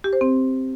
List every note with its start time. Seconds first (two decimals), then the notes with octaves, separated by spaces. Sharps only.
0.04 G4
0.13 C5
0.21 C4